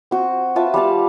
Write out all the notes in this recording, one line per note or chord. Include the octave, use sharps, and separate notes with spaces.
C4 F#4
F4 B4 E5 A5
G3 D5 F5 A5